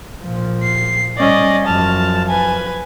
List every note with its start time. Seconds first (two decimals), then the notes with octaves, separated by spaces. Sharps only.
0.24 A#2 F3
0.63 C7
1.18 G3 C#4 D5 D#5
1.66 F#2 F3 A5 F6
2.29 B4 G#5